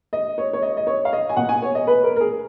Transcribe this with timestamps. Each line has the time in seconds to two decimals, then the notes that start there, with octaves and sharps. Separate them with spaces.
0.13 D#5
0.38 C#5
0.53 C#5
0.62 D#5
0.77 D#5
0.87 C#5
1.05 F5
1.13 D#5
1.29 G#5
1.36 B2 A#3 F#5
1.49 G#5
1.62 C#5
1.75 D#5
1.87 B4
2.04 A#4
2.16 A#4
2.21 G#4